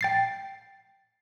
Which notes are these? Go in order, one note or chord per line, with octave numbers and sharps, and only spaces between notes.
G5 A6 C7